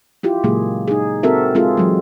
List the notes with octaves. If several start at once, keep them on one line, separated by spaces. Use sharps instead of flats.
E4 F4 G4
A#2 C#3 F#3 G#3 A#3 G#4
D#4 G#4
C4 F#4 A4 A#4 E5
G#3 C4 F4 G#4 A4
E3 F#3 G#3